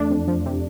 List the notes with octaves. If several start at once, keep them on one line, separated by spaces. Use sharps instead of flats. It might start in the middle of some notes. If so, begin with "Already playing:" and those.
Already playing: E2 A3 D4
F2
F3
C3